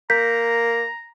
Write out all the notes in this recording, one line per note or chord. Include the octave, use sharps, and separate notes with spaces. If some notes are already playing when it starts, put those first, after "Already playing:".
A#3 A#5 G6 B6